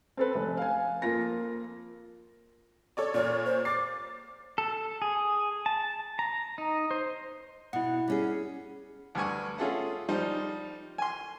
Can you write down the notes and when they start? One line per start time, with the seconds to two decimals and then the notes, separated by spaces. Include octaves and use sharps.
0.17 C4 A4 B4
0.35 F1
0.57 F5 G#5
1.02 F2 A#3 F4 A#6
2.97 A4 C#5 D5
3.14 A#2 C#5 D5 F6
3.45 C5
3.65 D6 A6 C7
4.58 A4
5.02 G#4
5.66 A5
6.19 A#5
6.58 D#4
6.91 C5
7.73 B2 E4 F#5
8.08 G3 C#4 G#4
9.15 D2 G2 G#5 C#6
9.58 C#4 F4 G#4 A4 E5 F#5
10.09 F3 G3 D#4 C5
10.98 G#5 C6